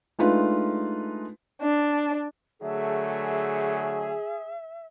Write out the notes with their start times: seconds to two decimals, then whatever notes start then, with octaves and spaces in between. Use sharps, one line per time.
0.19 G#3 A3 D4 D#4 F4 B4
1.60 D4
2.62 D3 F#3 A3 G#4 E5